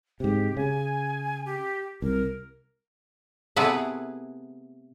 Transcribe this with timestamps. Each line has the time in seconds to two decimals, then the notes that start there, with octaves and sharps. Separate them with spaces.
0.20 G#2 C3 G4
0.57 C#3 G#5
1.46 G4
2.02 C2 A#4
3.56 C3 A3 B3 E4 G#4 B4